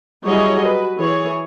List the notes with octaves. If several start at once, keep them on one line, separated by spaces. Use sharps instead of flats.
F#3 G3 E4 G#4 C#5 D#5
F#4 B4
E3 G#4 C#5